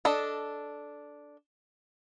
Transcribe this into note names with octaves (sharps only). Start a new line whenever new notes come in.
D4 A4 D#5